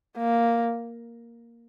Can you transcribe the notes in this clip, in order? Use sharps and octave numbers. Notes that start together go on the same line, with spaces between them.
A#3